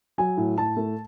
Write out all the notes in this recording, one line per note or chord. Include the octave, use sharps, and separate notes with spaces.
F#3 G#5
A2
A2 A5
A3